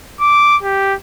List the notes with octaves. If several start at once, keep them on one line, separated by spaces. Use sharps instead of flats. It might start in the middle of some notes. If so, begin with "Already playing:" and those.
D6
G4